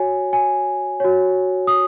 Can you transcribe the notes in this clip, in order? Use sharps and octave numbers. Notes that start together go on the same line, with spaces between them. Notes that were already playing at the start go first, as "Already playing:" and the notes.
Already playing: F#4 C#5 G#5
G#5
F#4 C#5
D#6